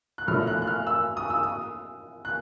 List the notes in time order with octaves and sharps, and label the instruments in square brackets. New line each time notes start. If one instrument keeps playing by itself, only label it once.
[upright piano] F#6
[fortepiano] A#1 A2 F3 A3 [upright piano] F6
[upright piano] F#6
F#6
F6
E6
D#6
E6
D#6
F#6